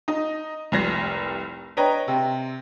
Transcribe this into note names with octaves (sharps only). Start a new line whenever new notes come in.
D#4
F1 C2 A#6 C7
D4 B4 C#5 D#5 G5 A#5
C3 C4